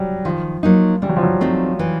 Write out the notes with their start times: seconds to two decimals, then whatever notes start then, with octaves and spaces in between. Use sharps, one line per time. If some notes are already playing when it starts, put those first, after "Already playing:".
Already playing: F#3 G3
0.25 D#3 F3
0.63 F#3 A#3 D#4
1.02 E3 G3
1.09 F#3
1.17 F3
1.23 F#3
1.41 A3 C4 D#4
1.79 E3